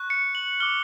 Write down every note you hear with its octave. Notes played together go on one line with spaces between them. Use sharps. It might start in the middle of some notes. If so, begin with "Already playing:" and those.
Already playing: C#6 F#6
C#7
F#7
D6 F6 G7